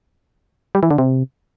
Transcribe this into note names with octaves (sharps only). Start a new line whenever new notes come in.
G3
E3
D3
C3